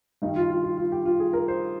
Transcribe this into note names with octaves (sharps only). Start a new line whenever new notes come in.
G2 D#3 G3 D#4
F4
F4
F4
F4
G4
F4
G#4
A#4
C5